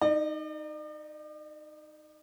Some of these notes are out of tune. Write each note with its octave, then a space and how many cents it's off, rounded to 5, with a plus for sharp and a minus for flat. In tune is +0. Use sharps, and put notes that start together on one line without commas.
D#4 +0 D5 +45